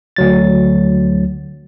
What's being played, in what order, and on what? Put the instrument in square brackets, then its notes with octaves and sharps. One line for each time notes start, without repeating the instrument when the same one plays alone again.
[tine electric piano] D2 F#3 A6